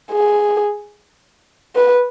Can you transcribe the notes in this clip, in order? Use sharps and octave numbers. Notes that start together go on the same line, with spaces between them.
G#4
B4